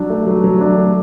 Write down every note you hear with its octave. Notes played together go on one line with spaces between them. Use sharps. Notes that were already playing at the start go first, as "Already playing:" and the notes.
Already playing: F#3 D4
A3
F#3
F#3
D4
A3